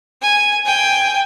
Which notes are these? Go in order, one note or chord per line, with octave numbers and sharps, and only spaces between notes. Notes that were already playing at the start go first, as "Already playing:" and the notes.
G#5
G5 G#5